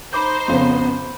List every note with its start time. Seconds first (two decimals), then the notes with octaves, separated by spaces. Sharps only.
0.13 D#4 C5 B5 D6 G6
0.48 F2 C#3 B3